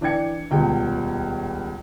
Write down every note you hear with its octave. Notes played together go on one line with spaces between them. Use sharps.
E3 D4 D5 G5 G#6 C#7
D#1 C#2 B2 G5